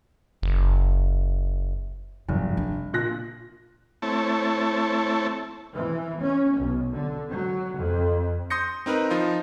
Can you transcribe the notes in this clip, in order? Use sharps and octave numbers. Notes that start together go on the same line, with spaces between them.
F#1
F1 G2 F#3
D4
A#2 F#6 A#6
A3 C4 E4 C#5 A5
E3
C#4
B1
D3
F#3
F2
C6 D#6 G6 A#6 C#7
C4 D#4 A#4 B4
F3 D#4 F4